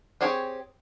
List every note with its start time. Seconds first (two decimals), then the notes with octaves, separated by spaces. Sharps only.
0.21 C4 G4 G#4 C#5